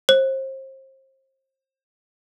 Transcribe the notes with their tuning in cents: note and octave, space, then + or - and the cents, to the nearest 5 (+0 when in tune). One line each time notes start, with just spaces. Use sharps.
C5 +30